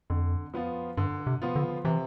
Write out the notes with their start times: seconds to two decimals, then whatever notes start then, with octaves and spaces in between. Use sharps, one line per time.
0.10 F2 D3
0.54 F3 B3 F4
0.97 G2 D3
1.27 C3
1.42 F3 B3 F4
1.56 D3
1.85 C3 E3